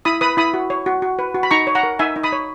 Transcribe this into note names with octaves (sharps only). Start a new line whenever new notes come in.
E4 B5 D#6
B4 B5 D#6
E4 B5 D#6
F#4
C#5
F#4
F#4
B4
F#4
B5
D#4 A#5 C#6
C#5
F#5 A#5
A#4
D#4 E5 G#5
D#4
B5 D#6
C#5